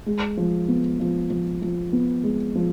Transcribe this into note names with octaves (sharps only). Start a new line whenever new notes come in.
G#3
F3
B3
F3
F3
F3
B3
G#3
F3